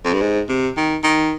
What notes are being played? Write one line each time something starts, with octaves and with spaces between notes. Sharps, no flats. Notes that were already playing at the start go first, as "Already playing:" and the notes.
F2
G2
G#2
C3
D#3
D#3